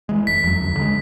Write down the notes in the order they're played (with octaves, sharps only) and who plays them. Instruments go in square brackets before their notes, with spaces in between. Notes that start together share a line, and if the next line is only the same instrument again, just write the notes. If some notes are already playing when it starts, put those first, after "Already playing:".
[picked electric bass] E3 G#3
[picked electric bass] F1 [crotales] B6
[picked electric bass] F2 C#3 F#3
D2
D3 F3
G#3